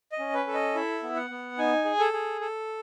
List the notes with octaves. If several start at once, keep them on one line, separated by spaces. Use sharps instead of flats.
D#5
C#4
B4
A4
D#5
E4 E5
B3
F#5
B3
D#4 G#5
G#4
A4
G#4
A4